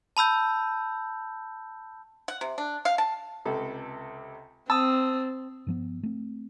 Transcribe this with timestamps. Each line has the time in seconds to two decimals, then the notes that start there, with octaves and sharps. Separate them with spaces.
0.17 A5 B5 E6 G6
2.28 F#5
2.41 C3
2.58 D4
2.85 F5
2.98 A5
3.45 C#2 C3 A4
4.70 C4 A5 D#6 E6
5.67 G2 F3 B3
6.03 A3 C4